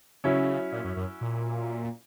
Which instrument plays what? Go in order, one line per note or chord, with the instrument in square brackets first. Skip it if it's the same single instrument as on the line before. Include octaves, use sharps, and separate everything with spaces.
[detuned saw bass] C#3 [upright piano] F#3 C#4 E4
[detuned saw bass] A#2
F#2
F#2
A#2